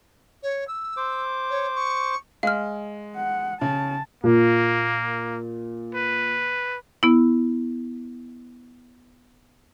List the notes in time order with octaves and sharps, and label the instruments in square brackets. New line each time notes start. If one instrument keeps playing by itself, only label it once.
[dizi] C#5
E6
[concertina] C5 D6
[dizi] C#5
C#6
[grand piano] G#3 [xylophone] F5 F6
[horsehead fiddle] F#5
[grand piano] C#3 [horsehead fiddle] A5
[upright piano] A#2 [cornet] A#3
[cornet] B4
[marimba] B3 E4